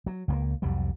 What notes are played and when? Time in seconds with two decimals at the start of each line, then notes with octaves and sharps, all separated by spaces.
0.06 F#3
0.28 C#2 A3 A#3
0.62 C2 F2 F#3 G3